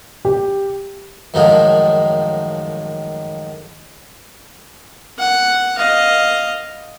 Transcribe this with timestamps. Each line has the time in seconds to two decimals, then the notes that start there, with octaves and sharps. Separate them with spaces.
0.25 G4
1.34 F#2 A2 D#3 F3 G#3
5.19 F#5
5.78 D#5 F5